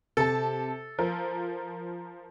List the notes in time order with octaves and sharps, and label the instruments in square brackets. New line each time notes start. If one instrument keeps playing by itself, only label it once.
[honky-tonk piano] C3 A5 [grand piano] A4
[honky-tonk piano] F3 A#4